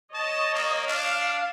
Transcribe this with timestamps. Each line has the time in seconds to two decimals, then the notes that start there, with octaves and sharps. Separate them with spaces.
0.14 C#5 D#5 A5
0.55 A#3
0.87 D4 F5